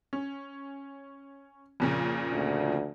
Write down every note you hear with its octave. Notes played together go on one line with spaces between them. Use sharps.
C#4
F2 A#2 C#3
D2